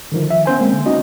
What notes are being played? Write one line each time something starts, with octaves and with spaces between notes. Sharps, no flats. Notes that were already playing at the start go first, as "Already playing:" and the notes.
D3 D#3 F3
E5
B3 C#4 C5 G#5
G#3 A#3 C4
D3
C#4 D#4 F#4 D#5